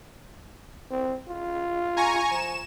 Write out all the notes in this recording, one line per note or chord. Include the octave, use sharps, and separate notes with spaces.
C4
F4
G#5 A#5 C#6
F3 E7